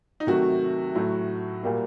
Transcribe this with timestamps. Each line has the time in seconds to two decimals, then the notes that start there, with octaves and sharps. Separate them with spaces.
0.20 D#4
0.27 C3 D#3 F#3 A3 F#4
0.95 A2 F#3 A3
1.63 A#2 G3 A#3